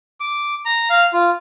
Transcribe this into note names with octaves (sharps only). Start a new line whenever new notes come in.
D6
A#5
F5
F4